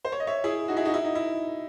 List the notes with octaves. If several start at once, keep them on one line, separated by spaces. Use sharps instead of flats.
C5
C#5
D#5
C#5 E5
E4 G#4
D#4 F#4
E4 G#4
D#4 F#4
E4
D#4
E4